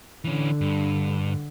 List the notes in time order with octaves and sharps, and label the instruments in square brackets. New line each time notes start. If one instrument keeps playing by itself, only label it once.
[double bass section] D3 [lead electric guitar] E3 C#4
[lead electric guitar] G2